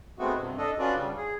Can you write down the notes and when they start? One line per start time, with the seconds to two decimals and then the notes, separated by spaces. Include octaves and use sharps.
0.19 G#3 A3 B3 C4 F#4
0.37 G2 C3
0.58 D4 A4 D#5
0.79 C#4 D4 F4 F#4 B4 D5
0.94 C#3 G3
1.17 G#4